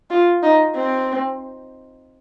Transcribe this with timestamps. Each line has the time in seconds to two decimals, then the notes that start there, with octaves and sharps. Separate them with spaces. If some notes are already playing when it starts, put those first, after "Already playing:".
0.10 F4
0.42 D#4
0.76 C4